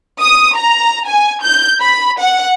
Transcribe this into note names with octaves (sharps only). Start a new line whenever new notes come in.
D#6
A#5
G#5
G6
B5
F#5